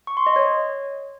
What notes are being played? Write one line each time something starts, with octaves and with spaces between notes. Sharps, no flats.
C#6
C6
D#5
C#5